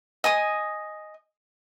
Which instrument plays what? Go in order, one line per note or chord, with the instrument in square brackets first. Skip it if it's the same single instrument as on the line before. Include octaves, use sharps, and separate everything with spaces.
[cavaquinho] D#5 G#5 D#6